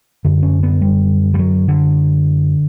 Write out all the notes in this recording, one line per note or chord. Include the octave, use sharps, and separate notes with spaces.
F#2 D3
C#4
B3
G3
G3
F#3
D3